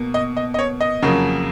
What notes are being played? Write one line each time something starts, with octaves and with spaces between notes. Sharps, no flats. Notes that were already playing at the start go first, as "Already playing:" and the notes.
Already playing: B2 A#3
D#5
D#5
D#5
C#5
D#5
F2 C#3 F#3 A#3